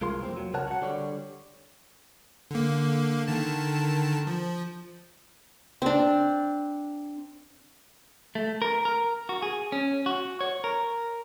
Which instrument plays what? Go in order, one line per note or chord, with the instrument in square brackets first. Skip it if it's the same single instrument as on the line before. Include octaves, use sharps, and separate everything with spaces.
[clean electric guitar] C2 G#3 F4 A#4 C6
F2 A#3 C4
F#3
C2 C#3 A#4 C#5 F#5 A5
F#4 F#5
D3 G3 C#5
[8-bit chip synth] D3 A#3
D3 D#3 A5
F3
[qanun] C4 D4
[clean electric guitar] A3
A#4
A#4
F#4
G#4
C#4
F#4
C#5
A#4